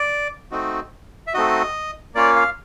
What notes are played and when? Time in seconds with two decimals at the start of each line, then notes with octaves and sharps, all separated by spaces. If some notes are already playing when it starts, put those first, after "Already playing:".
Already playing: D5
0.51 A3 C4 D#4 F#4
1.27 E5
1.34 A3 C4 D#4 F#4 D#5
2.15 A#3 C#4 F4 D5
2.36 F5